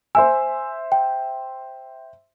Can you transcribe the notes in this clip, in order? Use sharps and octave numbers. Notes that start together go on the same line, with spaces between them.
C5 E5 G#5 E6
G5